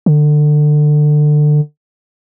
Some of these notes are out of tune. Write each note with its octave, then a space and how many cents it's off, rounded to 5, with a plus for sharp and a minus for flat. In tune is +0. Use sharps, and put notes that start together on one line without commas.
D3 +25